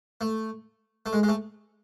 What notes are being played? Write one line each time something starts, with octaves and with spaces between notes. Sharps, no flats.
A3
A3
G#3
G#3
A3